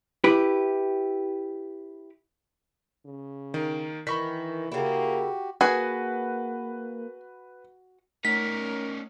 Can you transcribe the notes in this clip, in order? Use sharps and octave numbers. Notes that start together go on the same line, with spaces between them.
E4 G4 B4
C#3
D#3 A#3
D#3 E3 B5 C#6 B6
C#3 A#3 E4 F#4 G4
A#3 F#4 G#4 B4
A3 C#4 D#4 A#4 B6